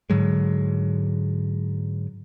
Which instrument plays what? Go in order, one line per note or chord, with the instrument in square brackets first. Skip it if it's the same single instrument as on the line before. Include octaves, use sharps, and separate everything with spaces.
[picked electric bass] G#2 D3 F#3 G#3